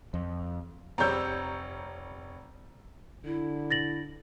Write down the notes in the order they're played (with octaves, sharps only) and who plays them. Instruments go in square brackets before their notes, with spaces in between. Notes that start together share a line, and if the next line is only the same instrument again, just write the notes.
[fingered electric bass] F2
[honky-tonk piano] F1 C#5 E6 [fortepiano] G3 C4 [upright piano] A#5 G6
[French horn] D3 [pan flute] E4
[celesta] A6 A#6 F#7